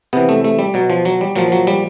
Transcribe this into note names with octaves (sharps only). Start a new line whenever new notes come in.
C3 E3 B3
A3
A3
G3
B2 F#3
F3
F#3
G3
A#2 F3 F#3
F#3
G3